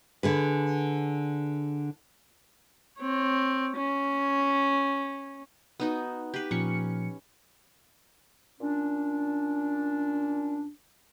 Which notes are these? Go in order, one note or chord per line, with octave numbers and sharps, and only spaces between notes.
D3 G#4 B4
C4 C#5
C#4
B3 D#4 F#4
G4 B4
A#2 F3 C#4 C#7
A#2 C#4 D4